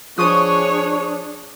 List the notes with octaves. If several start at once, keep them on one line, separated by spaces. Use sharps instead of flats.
F3 D4 G#4 C5 C#5 C#6 D#6 F#6